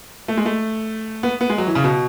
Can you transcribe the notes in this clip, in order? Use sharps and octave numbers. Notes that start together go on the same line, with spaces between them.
A3
G#3
A3
B3
B3
G#3
F#3
E3
C#3
B2